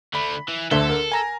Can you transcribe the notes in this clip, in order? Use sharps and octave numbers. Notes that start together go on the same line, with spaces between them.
D3 A3 B5
E3
D2 D3 A4 E5 G7
A#4
G#5 A#5 A#6